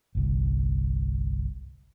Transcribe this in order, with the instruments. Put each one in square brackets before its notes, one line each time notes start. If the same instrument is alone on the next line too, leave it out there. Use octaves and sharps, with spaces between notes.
[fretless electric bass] G1 C2